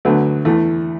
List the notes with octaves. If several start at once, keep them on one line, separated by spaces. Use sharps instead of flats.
D2 D3 F#3 A3 B3
E2 E3 A3